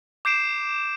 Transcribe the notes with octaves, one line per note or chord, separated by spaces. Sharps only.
D6 G6 C7 D7 E7